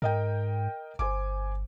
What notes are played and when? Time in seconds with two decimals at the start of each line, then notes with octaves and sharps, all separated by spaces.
0.02 G#2 A#4 D#5 G5
0.99 G1 C5 G#5 D6